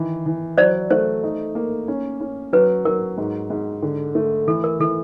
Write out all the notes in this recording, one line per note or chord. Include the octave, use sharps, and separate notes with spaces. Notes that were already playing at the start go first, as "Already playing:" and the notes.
Already playing: D#3 E3
E3
F#3 C5 D5
A3 C5
D#4
A#3
C#4
C#4
F#3 B4
F#3 A#4
G#2
G#2
D3
A3
E3 A4
A#4
E3 A4